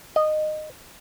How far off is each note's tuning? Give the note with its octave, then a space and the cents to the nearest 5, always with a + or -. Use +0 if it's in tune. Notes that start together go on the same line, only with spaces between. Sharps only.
D#5 -15